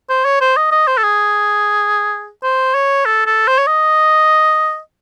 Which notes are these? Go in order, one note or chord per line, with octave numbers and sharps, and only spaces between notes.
C5
C#5
C5
D#5
D#5
C5
A4
G#4
C5
C#5
A4
A4
C5
C#5
D#5